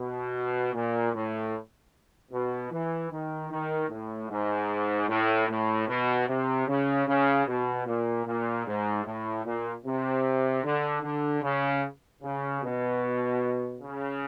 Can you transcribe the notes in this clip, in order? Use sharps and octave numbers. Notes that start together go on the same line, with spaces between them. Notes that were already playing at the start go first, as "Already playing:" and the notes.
Already playing: B2
A#2
A2
B2
E3
D#3
D#3
A2
G#2
A2
A2
B2
C3
C#3
C#3
B2
A#2
A#2
G#2
A2
A#2
C3
D3
D3
C#3
C#3
B2
C#3